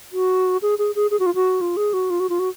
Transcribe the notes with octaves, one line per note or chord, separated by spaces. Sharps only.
F#4
G#4
G#4
G#4
G#4
F#4
F4
F#4
F4
G#4
F#4
F4
F#4
F4
F#4